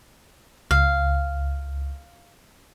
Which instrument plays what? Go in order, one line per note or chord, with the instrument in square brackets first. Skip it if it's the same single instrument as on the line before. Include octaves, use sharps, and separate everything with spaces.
[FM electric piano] C#2 [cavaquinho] F5